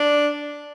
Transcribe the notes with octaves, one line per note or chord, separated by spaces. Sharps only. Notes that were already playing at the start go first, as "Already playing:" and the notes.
Already playing: D4